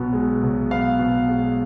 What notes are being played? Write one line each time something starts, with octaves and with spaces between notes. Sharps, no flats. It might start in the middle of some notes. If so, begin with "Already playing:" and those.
Already playing: B1 B2 B3
G#3
B1
B3 F5
B2
G#3